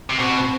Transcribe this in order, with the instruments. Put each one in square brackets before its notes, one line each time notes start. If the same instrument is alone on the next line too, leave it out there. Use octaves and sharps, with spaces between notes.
[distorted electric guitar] C3
[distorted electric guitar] B2 [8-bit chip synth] C4